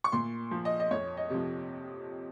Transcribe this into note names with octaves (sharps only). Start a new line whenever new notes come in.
C#6
A#2 C6
F3
D#5
D#5
F2 C#5
D#5
C3 F3